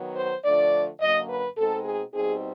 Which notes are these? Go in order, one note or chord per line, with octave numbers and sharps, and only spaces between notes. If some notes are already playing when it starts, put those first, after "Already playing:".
Already playing: D#3 F#3 B3
C5
D3 F3 A3 D4 D5
F#2 D3 F#3 A#3 D#5
B4
B2 G#3 C4 D#4 A4
G#4
B2 G3 C4 D#4 G#4